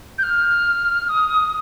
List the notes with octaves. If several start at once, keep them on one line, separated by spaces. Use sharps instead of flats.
G6
F6
D#6